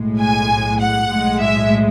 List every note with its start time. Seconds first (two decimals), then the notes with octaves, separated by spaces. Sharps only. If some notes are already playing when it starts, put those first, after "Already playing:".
Already playing: B1 A2 G#3
0.20 G#5
0.80 F#5
1.12 B1 A2 G#3
1.43 E5